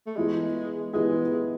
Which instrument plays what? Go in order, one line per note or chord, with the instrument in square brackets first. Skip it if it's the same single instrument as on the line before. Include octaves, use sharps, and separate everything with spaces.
[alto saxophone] A3
[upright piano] E3 B3 E4 G#4 [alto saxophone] G#3
[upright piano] E3 B3 E4 G#4 [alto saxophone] G#3